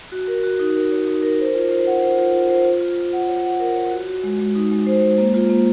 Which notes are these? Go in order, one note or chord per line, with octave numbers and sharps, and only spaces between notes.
F#4
A#4
F#4
D#4
A#4
C#5
D#4
A#4
C5
F4
C5
F#5
C5
F4
F4
C5
F4
F4
F4
F#5
C#5
F#5
A#4
C#5
F#4
F#4
G#3
G#3
D#4
G#3
C5
G#3
A#3
F4
A#3